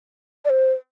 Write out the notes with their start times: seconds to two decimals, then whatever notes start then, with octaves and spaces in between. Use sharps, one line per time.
0.45 D5
0.50 C5